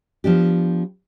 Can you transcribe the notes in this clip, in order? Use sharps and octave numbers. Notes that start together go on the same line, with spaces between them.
F3 B3 D4 G4